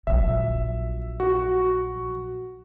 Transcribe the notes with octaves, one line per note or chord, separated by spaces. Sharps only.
A#1 F#3 E5
F#4